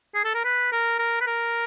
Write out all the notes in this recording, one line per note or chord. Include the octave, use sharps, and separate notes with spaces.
G#4
A4
A#4
B4
A#4
A#4
B4
A#4